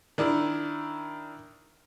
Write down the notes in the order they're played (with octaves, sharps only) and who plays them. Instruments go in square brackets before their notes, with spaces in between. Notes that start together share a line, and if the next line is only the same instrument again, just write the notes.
[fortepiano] D#3 D4 E4